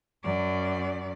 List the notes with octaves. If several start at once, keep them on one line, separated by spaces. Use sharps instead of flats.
F#2 D5